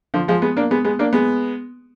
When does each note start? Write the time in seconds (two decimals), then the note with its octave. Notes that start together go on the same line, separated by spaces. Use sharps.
0.14 D3 F3
0.28 F3 G#3
0.42 G#3 B3
0.57 A#3 D4
0.71 G#3 B3
0.85 G#3 B3
0.99 A#3 D4
1.13 G#3 B3